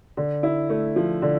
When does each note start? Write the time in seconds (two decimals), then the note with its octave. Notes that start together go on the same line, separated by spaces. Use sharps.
0.17 D3
0.43 E4
0.70 A3
0.96 F3
1.22 D3